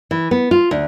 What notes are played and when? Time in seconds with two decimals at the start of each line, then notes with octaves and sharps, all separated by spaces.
0.11 E3
0.31 B3
0.51 F4
0.71 D2